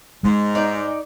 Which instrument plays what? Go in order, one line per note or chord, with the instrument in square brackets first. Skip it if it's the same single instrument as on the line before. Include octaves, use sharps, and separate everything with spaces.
[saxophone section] G#2 [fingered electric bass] G#3
[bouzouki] D#4 D5